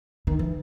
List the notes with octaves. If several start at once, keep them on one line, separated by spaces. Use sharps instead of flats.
D#3
E3